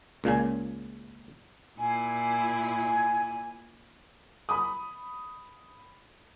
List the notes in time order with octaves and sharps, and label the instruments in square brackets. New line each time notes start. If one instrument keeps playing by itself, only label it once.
[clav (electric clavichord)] C#2 A#2 C#3 G#5
[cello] A#2 E4 [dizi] G#5
[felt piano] B5 D#6